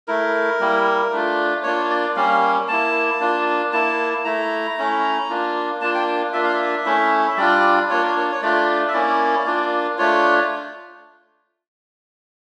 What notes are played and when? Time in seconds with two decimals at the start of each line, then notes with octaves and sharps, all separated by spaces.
0.08 A3 E4 A#4
0.60 G3 A#3 E4
1.12 A3 D4 F4
1.63 A#3 D4 F4 C#5
1.90 D5
2.16 G3 A#3 C#4 F5
2.68 A#3 E4 A5
3.20 A#3 D4 F4
3.73 A#3 E4 A5
4.25 A3 E4 A#5
4.77 A3 C#4 E4
5.29 A#3 D4 F4
5.81 A#3 D4 F4 A5
5.94 G5
6.33 A#3 D4 F4 E5
6.44 F5
6.53 E5
6.86 A3 C#4 E4
7.26 E5
7.37 G3 D4 F4 D5
7.89 A#3 D4 F4 C#5
8.03 A#4
8.17 C#5
8.32 C#5
8.42 A3 D4 F4 D5
8.88 E5
8.93 A#3 C#4 E4 D5
9.46 A#3 D4 F4
9.98 A3 D4 F4 C#5